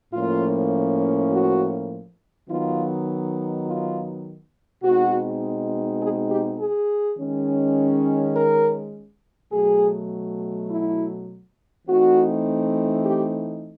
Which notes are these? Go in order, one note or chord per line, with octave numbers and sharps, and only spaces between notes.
A2 F3 A#3 C#4 F4
F#4
D#3 F#3 B3 D#4 F4
F4
B2 G#3 C4 D#4 F#4
G#4
G4
G#4
D#3 G#3 C#4
A#4
B2 F#3 A3 G#4
E4
E3 A3 C4 D#4 F#4
G4